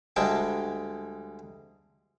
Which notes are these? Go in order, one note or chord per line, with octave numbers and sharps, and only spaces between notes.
D2 G3 G#3 G5 A5